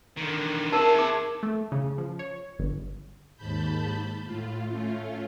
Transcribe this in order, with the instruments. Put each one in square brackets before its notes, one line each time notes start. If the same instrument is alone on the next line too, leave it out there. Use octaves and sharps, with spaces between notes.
[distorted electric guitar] D3 D#3
[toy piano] D#4 A#4 A5 [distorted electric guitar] G#4 E5
[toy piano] D#4 D6
[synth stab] A3
C#3
F3
C#5
G1
[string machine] D#2 G#2 A5 B5 G6
A2 F4
A3 C#4 F4